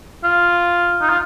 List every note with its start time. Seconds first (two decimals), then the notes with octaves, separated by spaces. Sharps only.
0.24 F4
1.01 D#4
1.10 F4